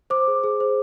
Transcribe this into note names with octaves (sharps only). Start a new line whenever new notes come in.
C5 D6
G#4
G#4
C5